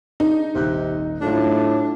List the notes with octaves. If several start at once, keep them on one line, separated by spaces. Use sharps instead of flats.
D4 D#4 G#4 D5
D#1 G#1 C3 F#6
A2 F#3 A3 D4 F4